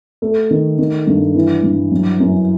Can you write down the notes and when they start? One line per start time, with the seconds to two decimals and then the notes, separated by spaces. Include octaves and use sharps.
0.22 A3
0.51 D#3
0.79 D#3
1.07 G2
1.35 E3
1.63 G2
1.92 F#3
2.20 F#2